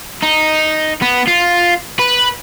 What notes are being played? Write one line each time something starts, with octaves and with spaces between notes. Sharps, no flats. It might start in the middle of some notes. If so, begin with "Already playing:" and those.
D#4
B3
F4
B4